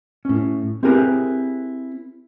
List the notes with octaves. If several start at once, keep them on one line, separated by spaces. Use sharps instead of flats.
A2 C#4
C4 E4 G4 G#4 A#4 B4